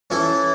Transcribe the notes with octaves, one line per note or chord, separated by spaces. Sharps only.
E3 C#4 E4 A4